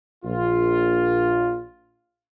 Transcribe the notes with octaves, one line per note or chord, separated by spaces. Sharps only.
A#1 F4